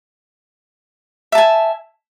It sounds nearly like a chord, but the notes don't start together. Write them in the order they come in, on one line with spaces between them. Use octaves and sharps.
E5 A5 G#5